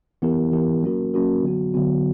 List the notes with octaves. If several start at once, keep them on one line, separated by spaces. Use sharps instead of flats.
E3 B3 E4 G4 A#4
E3 B3 E4 G4 A#4
F#3 A#3 C#4 F#4 A#4
F#3 A#3 C#4 F#4 A#4
D3 F#3 B3 F#4
D3 F#3 B3 F#4